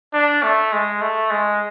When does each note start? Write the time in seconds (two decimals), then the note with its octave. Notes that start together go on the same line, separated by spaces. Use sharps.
0.13 D4
0.43 A3
0.72 G#3
1.01 A3
1.30 G#3